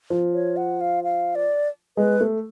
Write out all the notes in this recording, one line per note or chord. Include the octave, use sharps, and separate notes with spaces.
F3
C#5
F#5
F5
F5
D5
G#3 B4
A3